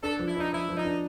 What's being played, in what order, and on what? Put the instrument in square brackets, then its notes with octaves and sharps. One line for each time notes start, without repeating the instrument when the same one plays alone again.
[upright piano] D4 [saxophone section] A4
[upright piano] F3
[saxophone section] E4
[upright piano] D4 [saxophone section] D#4
[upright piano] F3 [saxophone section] E4
[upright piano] F3
[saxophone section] D#4
[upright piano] D4